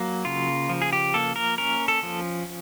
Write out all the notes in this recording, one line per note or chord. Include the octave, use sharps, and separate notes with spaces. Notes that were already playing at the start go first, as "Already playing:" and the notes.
Already playing: F#3 A#3
C#3 F4
F3
G#4
G4
A#3 A4
A#4
C#4 A#4
A4
F3